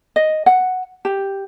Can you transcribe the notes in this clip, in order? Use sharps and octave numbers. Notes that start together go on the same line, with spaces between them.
D#5
F#5
G4